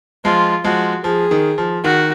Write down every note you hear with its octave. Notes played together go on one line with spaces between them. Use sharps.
F3 G#3 F4
F3 G#3 F#4
F3 G#4
D#3
F3
D#3 F#4